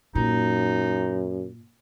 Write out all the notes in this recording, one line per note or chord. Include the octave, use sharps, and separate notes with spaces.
F#2 A#2 D#4